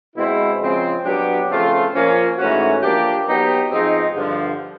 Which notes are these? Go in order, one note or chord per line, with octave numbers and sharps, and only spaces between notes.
B2 G#3 C4 E4
C#3 F3 G#3 C4
B2 F#3 B3 D4 G4
C#3 F3 A3 C4 F4
A#2 F3 A#3 C#4
G#2 E3 A3 C#4 F#4
F3 A#3 D4 G4
F#3 B3 D#4 G4
G#2 F3 G#3 C4 D#4
G2 D3 F3